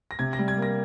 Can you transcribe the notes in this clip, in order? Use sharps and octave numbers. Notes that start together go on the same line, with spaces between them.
A#6
C3 G#6
A#6
G3
G#6
A#3 A#6